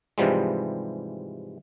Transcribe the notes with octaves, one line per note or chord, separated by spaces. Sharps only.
G#2 C3 E3 F3 G3 G#3